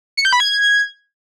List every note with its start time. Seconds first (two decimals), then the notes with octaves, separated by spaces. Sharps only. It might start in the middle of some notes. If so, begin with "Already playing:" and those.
0.17 C#7
0.25 G6
0.33 B5
0.40 G#6